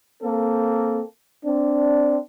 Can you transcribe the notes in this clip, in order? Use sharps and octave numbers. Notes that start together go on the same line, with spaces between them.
A#3 C4 A4
C4 D4